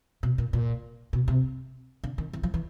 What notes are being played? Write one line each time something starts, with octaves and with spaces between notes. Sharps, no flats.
B2
A#2
A#2
B2
C3
D3
D#3
E3
F3
E3